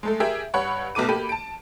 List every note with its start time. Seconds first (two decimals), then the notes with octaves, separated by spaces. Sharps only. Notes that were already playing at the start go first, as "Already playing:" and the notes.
0.03 G#3 A3 A4
0.20 G4 G#4 A#4 E5
0.54 G2 C#5 F#5 B5
0.95 B1 B2 A3 D6 D#7
1.08 A#3 G4 A4 B5 D#7
1.29 A5 D7